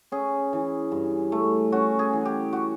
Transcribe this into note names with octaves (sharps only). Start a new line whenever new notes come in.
C#4 G#4
E3
G2
A3
C#4 F#4
G#4
E3
G4
F#4